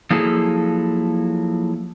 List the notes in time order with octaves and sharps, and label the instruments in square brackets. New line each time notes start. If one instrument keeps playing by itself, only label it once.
[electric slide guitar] F3 F#3 A#3 E4 G#4 A4